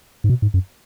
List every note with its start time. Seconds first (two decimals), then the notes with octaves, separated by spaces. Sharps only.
0.24 G#2
0.29 B2
0.42 G#2
0.54 F#2